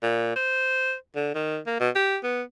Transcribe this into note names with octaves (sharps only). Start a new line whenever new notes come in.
A#2
C5
D3
D#3
A#3
B2
G4
B3